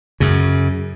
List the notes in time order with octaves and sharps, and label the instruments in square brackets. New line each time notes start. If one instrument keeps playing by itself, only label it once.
[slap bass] F#2 C#3